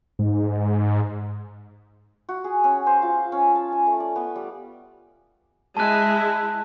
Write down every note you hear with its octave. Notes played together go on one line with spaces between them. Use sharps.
G#2
F#4
G#4
C#4
C5
F4
C#4
A5
G#5
A3
D5
B3
G3
G#3 E4 A5 F#6